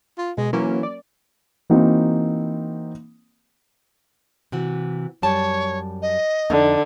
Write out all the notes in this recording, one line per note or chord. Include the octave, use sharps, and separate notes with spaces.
F4
B2 G#3
E3 F#3 A#3 C#4
D5
E3 A#3 C4 D#4 F#4
C3 E3 F#4
F#2 G3 C#5 A5
D#5
F2 D3 D#4